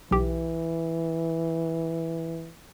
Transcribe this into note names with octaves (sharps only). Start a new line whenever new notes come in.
B1 E3 G4